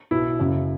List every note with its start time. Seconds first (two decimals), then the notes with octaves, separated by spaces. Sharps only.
0.11 B1 B2 E4
0.39 F#1 F#2 C#3